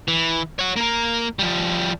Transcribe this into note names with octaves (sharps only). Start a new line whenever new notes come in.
E3
C#5 F#5
A#3 A#4
F3 G3